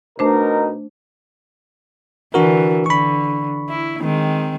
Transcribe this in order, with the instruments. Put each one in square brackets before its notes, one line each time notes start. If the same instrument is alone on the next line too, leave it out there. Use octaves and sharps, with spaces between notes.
[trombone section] B2 D#4 A#4 [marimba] A3 D4 C5
[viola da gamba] D3 E3 [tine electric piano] D4 F#4 A#4
[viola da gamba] D3 [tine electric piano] B5 C#6
[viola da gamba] E4
D#3 G#3 C4